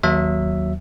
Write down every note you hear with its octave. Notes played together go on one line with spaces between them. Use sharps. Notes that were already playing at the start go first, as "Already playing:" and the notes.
D#2 F#3 E5